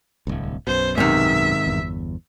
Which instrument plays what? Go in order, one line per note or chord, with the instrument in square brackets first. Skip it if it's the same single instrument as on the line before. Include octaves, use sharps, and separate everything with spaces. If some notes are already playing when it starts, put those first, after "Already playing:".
[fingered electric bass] D1 C2
[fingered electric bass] B1 F#2 B2 [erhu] C5
[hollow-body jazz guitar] G#2 C3 D#3 [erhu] E5
[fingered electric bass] G1 E2